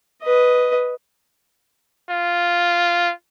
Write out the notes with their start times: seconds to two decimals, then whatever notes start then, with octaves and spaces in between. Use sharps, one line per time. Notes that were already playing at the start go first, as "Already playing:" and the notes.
0.23 B4 D#5
2.10 F4